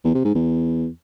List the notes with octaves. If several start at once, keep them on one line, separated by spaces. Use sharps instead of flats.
E2
C3
G#2
E2